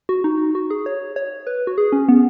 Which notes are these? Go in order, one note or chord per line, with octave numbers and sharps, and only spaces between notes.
F#4
D#4
F#4
G#4
C#5
C#5
B4
F#4
G#4
C#4
B3